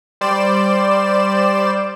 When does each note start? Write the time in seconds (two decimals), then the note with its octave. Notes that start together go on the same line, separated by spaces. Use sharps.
0.21 G3 C5 D5 E7